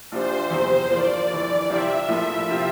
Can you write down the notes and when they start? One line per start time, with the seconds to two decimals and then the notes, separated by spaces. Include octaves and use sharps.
0.12 A#1 A#2 G3 D4 F4 C5
0.50 E2 C3 G3
0.90 G2 F3 A#3 F4 D5
1.30 G1 F2 E3
1.69 C2 C3 F3 C4 F4 E5
2.08 A#1 A2 F3 A#3 F4 E5
2.48 C3 F3 C4 F4